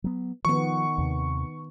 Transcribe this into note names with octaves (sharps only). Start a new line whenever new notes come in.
F#3 B3
D#3 F3 B3 C#6
D#2 C3